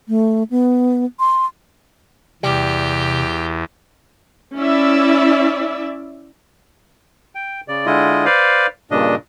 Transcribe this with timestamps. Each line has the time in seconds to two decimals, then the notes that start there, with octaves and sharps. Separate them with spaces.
0.09 A3
0.50 B3
1.20 C6
2.43 E2 C3 G3 G4
4.56 C#4 E4 D5 E5
7.35 G5
7.68 C#3 D5
7.86 D3 G#3 E4 F4 D#5
8.25 B4 C5 D5 F5
8.91 G2 A#2 C#3 D4 D#5